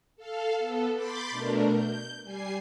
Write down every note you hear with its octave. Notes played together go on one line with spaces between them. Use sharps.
A4 F5
B3 A4
B5 C6 D6 G6 A6 B6
B2 A3 D4 A#4
G6
G3 G#5 C7